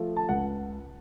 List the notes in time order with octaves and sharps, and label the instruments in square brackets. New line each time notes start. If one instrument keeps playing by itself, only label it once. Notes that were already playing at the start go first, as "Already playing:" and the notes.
Already playing: [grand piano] F3 A3
A5
C#2 F#5